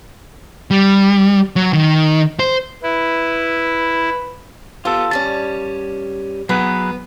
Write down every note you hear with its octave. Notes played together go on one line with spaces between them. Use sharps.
G3
F#3
D#3
C5
E4 B4
B3 F4 G4 A4
G2 G3 C#4 A5
F#3 B3 G#4 B4